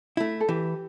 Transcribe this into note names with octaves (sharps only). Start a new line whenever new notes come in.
A3 E4
A4
E3 G4